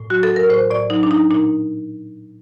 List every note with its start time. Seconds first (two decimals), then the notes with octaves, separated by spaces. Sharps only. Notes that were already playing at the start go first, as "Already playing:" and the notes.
Already playing: A2
0.10 F#3 F#4
0.23 A4
0.30 F#3
0.36 A#4
0.50 A2 C5
0.70 A2 D5
0.90 F#3 D#4
1.03 D4
1.10 F#3 D#4
1.31 A#2 D#4